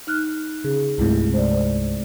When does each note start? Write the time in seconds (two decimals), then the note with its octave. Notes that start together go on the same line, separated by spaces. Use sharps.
0.07 D#4 F6 F#6
0.64 C#3 G#4
0.98 C2 G2 C3 G#3 A3 E4
1.34 C5 D5